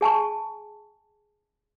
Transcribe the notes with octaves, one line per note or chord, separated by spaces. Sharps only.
G#4 G#5 A5 C#6